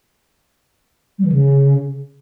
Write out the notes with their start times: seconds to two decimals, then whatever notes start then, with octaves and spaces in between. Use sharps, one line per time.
1.19 G3
1.25 E3
1.32 C#3